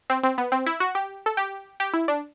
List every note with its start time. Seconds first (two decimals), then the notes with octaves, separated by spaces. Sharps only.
0.10 C4
0.23 C4
0.38 B3
0.52 C4
0.66 E4
0.80 F#4
0.95 G4
1.26 A4
1.37 G4
1.80 G4
1.93 E4
2.08 D4